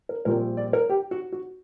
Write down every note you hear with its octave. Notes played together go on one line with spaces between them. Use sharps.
A#4
A#1 A#2 G3 C4 A#4
D5
A#4
G4
F#4
F#4